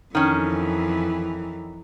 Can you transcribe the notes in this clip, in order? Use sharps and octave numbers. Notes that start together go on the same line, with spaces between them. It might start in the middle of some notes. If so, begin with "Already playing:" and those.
F2 D#3 E3 C#4